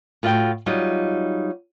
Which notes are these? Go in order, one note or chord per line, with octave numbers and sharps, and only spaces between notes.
A2 F4 F#4 F#5 G5
F#3 G3 D#4 F4